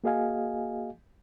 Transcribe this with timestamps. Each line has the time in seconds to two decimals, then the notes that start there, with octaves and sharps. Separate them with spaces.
0.04 A#3 F#4 G#4 D#5 F5 G#5